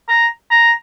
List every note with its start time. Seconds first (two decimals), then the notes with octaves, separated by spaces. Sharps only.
0.09 A#5
0.51 A#5